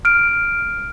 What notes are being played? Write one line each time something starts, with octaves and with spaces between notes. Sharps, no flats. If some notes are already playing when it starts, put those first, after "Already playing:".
F6 D7